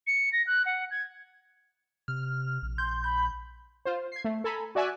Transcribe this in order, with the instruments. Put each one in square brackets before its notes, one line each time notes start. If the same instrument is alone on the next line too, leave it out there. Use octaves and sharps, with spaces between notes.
[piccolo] C#7
A#6
F#6
F#5
G#6
[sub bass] C3 [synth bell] F6
[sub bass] A#1
[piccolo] C6 [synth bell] G6
[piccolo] B5 [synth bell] G6
[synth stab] F4 C5
G#6 C7
A3
A4 G#5 A#5 B5
F#4 D5 E5 G#5 E6 F#6